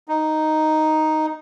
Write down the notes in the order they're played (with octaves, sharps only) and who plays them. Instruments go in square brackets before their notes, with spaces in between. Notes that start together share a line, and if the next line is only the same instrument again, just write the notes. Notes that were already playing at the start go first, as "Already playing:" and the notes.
[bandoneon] D#4